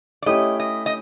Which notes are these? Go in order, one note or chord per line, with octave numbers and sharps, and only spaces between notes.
D5
A3 C#4 E4 G4 D#5
D#5
D#5